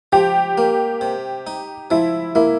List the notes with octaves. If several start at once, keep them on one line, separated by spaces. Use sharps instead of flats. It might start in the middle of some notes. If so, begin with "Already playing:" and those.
F3 G4
A#3
C3
D#4
F3 E4
A#3 E4